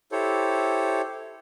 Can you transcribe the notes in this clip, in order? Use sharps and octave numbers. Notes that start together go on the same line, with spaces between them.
E4 G4 A4 C5 C#5